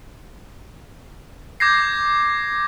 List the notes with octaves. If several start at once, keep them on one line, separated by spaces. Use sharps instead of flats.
D6 G6 G#6 A#6 C7